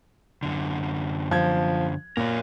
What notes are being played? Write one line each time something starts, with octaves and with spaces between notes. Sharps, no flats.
F#2 D3
F3 G#6
A#2 A#4 C#5